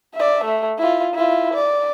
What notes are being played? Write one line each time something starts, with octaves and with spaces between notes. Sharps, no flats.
D5 E5
A3
E4 F4
E4 F4
D5